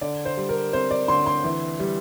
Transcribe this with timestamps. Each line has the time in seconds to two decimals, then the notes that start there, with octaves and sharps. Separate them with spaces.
0.01 D3 D5
0.25 C5
0.37 G3
0.49 A#4
0.73 C4 C5
0.91 D5
1.08 D2 C6
1.26 C6
1.44 E3
1.80 G3